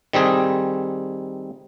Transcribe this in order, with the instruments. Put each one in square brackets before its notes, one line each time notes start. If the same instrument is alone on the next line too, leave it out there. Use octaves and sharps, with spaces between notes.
[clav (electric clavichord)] D#3 G3 C4 G#4